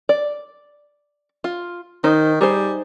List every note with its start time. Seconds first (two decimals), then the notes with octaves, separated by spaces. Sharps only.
0.09 D5
1.44 F4
2.04 D#3 D#4 C5
2.41 G3 D#4 G#4 C5